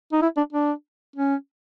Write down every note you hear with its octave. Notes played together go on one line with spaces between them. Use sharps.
D#4
E4
D4
D4
C#4